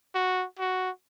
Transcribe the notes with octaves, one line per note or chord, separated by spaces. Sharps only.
F#4
F#4